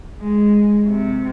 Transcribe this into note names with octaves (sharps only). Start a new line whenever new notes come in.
G#3
C3